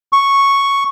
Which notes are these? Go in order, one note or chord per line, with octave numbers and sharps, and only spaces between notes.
C#6